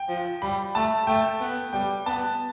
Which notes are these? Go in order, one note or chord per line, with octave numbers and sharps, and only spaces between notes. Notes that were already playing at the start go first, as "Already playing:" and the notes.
Already playing: G5
F3
G3 B5
A3 A5
A3 G5
B3
G3 G5
B3 A5